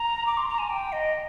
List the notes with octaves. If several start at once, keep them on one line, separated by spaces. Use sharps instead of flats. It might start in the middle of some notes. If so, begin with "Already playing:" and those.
Already playing: A#5
D6
C6
A#5
G#5
G5
D#5